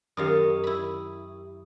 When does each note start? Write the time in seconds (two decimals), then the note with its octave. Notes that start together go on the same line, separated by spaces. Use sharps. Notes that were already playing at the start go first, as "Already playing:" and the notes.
0.17 F#2 D#3 G4 F5 D#6
0.64 E4 B5